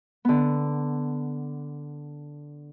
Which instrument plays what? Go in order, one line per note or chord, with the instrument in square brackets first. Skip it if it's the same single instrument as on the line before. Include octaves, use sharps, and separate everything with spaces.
[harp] D3 B3